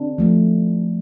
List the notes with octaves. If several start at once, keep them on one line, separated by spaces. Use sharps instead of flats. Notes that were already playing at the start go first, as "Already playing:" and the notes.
Already playing: C4 D4
F3 A3